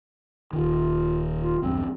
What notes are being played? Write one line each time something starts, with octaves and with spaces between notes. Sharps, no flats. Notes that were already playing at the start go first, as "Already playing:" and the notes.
D#1 D#3 F4
F4
B1 E2 G2 C4